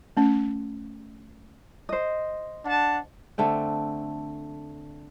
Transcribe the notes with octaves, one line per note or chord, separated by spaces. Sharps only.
A3 C#4
C5 D#5
D4 F#5 A5
D3 A3 C4 G5